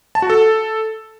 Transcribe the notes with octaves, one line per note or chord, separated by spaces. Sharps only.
A5
F#4
A4